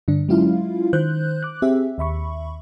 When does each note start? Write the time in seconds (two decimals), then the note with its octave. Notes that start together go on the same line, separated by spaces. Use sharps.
0.08 G2 D3 D4
0.29 F#3 G#3 C#4 E4 F4 F5
0.93 D#3 C5 F#6 G6
1.43 D6 F#6
1.62 C4 G4 G#4 E5
1.98 D#2 E5 B5 C#6